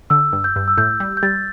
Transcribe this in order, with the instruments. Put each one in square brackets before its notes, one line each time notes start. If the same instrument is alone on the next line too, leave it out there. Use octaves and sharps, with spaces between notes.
[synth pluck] D3 [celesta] E6
[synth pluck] G2
[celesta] G6
[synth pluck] G2
[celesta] E6
[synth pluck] A2 [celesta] G6
[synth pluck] G3
[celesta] G6
[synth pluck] G3 [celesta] A6